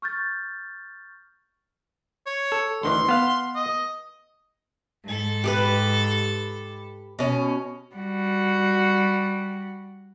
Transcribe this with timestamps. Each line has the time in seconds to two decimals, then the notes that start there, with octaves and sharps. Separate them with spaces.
0.02 C#6 F6 G6 A6
2.26 C#5
2.52 A4
2.83 D2 D#3 E3 C6
3.09 B3 F5
3.55 D#5
5.05 G#2 A4
5.44 G4 G#4 B4
7.19 B2 C#4
7.95 G3 F#4